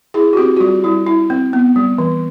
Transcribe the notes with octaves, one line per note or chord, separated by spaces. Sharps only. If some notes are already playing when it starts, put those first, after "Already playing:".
E4 G#4
F#4
C4 G4
F#4
G3 F4
G3 E4
E4
C4
B3
G3
E3